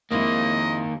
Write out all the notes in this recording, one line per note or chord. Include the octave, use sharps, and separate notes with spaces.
F2 D#3 G#3 A#3 E4 D#5